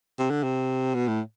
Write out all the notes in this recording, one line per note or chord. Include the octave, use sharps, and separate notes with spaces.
C3
D3
C3
B2
A2